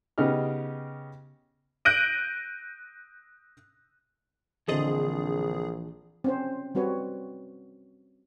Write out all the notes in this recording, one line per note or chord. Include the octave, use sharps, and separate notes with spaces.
C#3 B3 D#4 G4 F6
F#6 G6 A#6 D7 D#7
A#1 D3 E3 C4 G#4 A4 D#5
C4 C#4 C5
G3 C4 F#4 B4 C#5